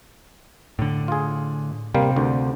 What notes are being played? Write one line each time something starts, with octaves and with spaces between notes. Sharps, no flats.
A2 D3
F4 G#4
C3 G3 A#3 F5
D2 D3